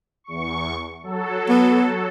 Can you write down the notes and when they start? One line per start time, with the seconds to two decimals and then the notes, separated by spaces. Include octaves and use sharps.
0.24 E2 C#6
1.03 F#3 A4
1.49 B3